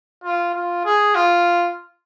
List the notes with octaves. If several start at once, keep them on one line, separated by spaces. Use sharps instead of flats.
F4
F4
G#4
F4